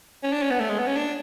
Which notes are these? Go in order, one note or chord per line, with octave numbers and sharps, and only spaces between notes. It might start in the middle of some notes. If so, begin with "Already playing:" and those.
C#4
D4
C#4
B3
A3
G#3
B3
C#4
D4